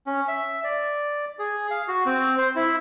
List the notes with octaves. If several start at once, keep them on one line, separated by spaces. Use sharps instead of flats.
C#4
E5
D5
G#4
F5
F#4
C4
C5
E4